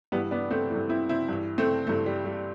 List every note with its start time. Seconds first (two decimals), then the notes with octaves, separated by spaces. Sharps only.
0.12 G2 E3 G3 B3
0.31 B3 D4
0.51 A3 C4
0.70 G2 E3 A3
0.89 C4 E4
1.09 C4 E4
1.29 G2 E3
1.58 A3 C4
1.87 G2 E3 A3
2.06 G3
2.26 G3